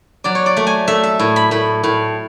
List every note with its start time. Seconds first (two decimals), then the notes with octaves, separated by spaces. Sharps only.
0.24 F#3 D5
0.35 C#5
0.46 D5
0.57 A3
0.67 G#5
0.88 A3 E5
1.03 E5
1.20 A2
1.36 B5
1.51 A2 B5
1.84 A2